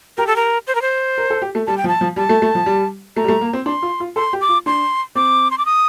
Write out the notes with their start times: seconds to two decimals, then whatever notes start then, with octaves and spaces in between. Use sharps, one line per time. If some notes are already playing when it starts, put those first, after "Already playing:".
0.17 G4 A#4
0.27 A4
0.36 A#4
0.67 C5
0.75 A#4
0.82 C5
1.18 A#4
1.30 A4
1.42 G4
1.55 A3
1.67 G3 A5
1.77 G5
1.84 F3
1.88 A5
2.01 F3
2.16 G3 A5
2.29 A3
2.42 A3
2.55 F3
2.66 G3
3.16 A3 A#5
3.24 G3
3.28 A3
3.41 A#3
3.53 C4
3.66 D4 C6
3.82 F4
4.00 F4
4.16 A4 C6
4.33 G4
4.41 D6
4.49 F4
4.66 D4 C6
5.15 C4 D6
5.51 C6
5.58 D6
5.66 D#6